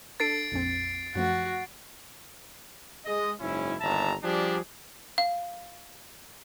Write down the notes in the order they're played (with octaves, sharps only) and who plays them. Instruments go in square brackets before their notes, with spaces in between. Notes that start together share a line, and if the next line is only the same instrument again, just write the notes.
[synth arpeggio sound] D4 A4 A5 [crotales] A6 C7 D7
[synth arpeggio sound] A#1 F2 C4
[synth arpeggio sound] F#2 F3 A3 [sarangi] F#4
[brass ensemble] G#3 D#5
F#1 G#2 C#4 E4
G1 D#2 E5 A5 A#5
F3 G3 D4 G4 G#4
[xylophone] F5